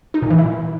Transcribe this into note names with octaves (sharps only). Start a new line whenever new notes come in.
D#4
A#2
E3
E4